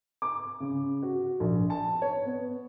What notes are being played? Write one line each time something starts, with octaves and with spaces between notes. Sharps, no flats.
D6
C#3
F#4
A#1
A5
C#5
B3